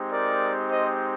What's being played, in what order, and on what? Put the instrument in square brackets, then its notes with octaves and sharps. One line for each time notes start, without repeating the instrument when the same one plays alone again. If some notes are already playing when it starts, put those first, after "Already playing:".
Already playing: [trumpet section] G#3 C4 D#4 G4
A#4 D5
C5 D#5